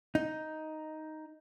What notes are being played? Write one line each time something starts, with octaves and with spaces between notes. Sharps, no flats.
D#4